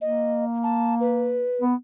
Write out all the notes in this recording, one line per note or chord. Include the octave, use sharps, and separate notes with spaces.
A#3 D#5
A5
B4
B3